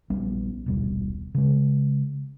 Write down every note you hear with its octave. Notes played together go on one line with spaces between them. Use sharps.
A#1 G3 B3 C#4
D#1 B1 G3
C#3 G#3